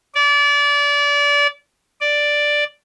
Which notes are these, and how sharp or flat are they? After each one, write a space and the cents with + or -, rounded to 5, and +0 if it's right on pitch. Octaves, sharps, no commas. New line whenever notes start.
D5 -30
D5 +0